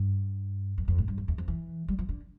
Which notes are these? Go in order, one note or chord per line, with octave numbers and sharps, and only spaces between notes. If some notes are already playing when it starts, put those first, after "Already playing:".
Already playing: G2
F2
F2
A2
G2
F2
E2
F2
E3
G3
F3
D3